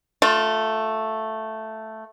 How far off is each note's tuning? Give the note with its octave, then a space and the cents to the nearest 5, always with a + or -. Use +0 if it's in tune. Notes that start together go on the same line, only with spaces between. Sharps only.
A3 +0 F4 +25